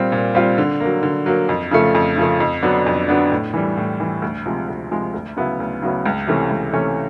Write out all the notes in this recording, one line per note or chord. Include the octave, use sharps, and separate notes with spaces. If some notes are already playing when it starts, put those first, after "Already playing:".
Already playing: A#2 G3 C4 F4
A#2
G3 C4 F4
D3
A#3
F#3
D3
F#3 A#3
F2
C#3 F3 A3
F2
C#3 F3 A3
F2
D3 F#3 B3 D4
F2
D3 F#3 B3 D4
A2
E3 G3
A2
E3 G3
D2
C3 F3 G#3
D2
C3 F3 G#3
D2
C#3 F#3 B3 E4
D2
C#3 F#3 B3 E4
C#2
C3 E3 A3 C#4
C#2
C3 E3 A3 C#4